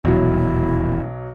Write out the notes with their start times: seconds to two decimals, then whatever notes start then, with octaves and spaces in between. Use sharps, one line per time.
0.05 D#1 B1 E2 F#3 E4